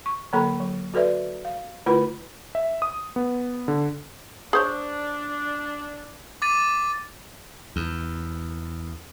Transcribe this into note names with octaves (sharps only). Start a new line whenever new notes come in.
C#6
D3 F#3 A#3 A4 A#5 B5
F#3
F#4 A4 B4 D5 E5
F5
D3 A3 E4 F4 B4 B5
E5
D#6
B3
D3
D4 G#4 C5 C#5
D6 A6 D#7
E2